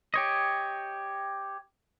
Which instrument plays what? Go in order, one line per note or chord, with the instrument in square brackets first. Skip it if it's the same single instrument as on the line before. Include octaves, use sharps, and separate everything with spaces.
[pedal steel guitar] G4 C#5 D#5